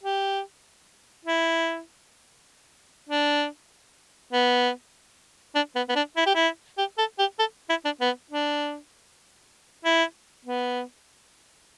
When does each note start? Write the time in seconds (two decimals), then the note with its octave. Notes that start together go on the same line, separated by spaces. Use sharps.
0.04 G4
1.25 E4
3.09 D4
4.33 B3
5.55 D4
5.76 B3
5.89 B3
5.96 D4
6.17 E4
6.26 G4
6.35 E4
6.78 G4
6.98 A4
7.19 G4
7.39 A4
7.70 E4
7.85 D4
8.01 B3
8.31 D4
9.85 E4
10.45 B3